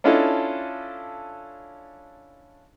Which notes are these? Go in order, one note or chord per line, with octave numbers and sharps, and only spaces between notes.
C#4 D4 E4 F4 A4 D#5